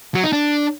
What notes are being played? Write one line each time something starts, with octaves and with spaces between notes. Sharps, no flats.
F#3
D#4
D4